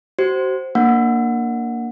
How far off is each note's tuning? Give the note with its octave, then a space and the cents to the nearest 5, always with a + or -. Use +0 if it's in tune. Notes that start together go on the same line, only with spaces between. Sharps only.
F#4 +35 C5 +5
A#3 +0 D4 +0 F#5 -15